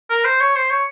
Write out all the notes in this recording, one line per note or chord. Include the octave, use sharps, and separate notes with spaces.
A#4
C5
C#5
C5
C#5